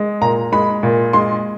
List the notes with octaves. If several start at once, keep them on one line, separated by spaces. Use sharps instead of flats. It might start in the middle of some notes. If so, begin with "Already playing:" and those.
Already playing: G#3
A#2 A#5
G#3 B5
A#2
G#3 C6